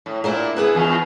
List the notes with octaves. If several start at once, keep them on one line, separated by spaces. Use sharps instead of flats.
A2
A#2 A#3 D4 E4
B3 E4 G#4 B4
E2 F4